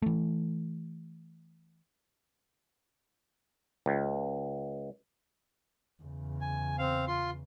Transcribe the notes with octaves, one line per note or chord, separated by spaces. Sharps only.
E3 A3
C#2
E2 C#3
G#5
C4 F5
F4 C6